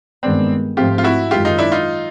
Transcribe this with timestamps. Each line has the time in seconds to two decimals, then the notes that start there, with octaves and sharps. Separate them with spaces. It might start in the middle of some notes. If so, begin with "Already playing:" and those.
0.23 G2 D#3 G#3 B3 C4 D4
0.77 G#2 F3 A3 C4 F4 G4
0.98 F4
1.04 E4 F#4
1.31 F#2 D#3 G#3 F4 G4
1.45 D#4 F4
1.58 D4 E4
1.72 D#4 F4